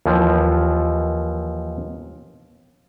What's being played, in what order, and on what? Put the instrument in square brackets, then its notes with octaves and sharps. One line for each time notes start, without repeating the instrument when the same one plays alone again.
[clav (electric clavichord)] D#2 E3 F3